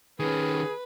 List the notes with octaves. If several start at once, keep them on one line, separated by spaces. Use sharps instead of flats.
D#3 C#4 G#4 B4